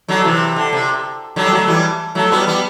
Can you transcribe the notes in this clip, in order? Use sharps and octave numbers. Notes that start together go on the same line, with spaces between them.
D3 F#3
C3 E3
D3
C3
D3 F#3
G3
F#3 A3
E3 G3
F#3 A3
G3 B3
G3 B3